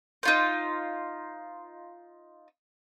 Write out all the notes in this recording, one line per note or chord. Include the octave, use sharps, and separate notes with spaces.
D#4 F4 C5